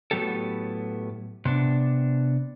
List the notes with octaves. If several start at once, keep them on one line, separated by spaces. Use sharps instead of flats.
A2 F#3 B3 G4 A4
C3 B3 D4